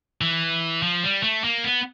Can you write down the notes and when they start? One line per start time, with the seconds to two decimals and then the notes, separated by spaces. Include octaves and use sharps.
0.21 E3
0.83 F3
1.03 G3
1.23 A3
1.44 A#3
1.64 B3